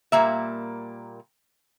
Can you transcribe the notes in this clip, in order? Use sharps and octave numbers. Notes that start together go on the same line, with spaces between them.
A#2 G3 A#3 E5